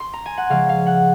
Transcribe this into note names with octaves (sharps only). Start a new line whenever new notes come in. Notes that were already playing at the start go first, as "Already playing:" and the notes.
C6
A#5
G#5
F#5
C#3 F3 G#3 F5
F5
F#5